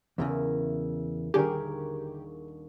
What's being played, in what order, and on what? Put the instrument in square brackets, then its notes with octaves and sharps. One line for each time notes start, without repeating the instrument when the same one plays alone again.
[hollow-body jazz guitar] E2 A2 C#3 [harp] E4 A#4 E5
[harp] D#1 D4 C#6 [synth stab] D3 G4 [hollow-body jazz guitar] G#4 A#4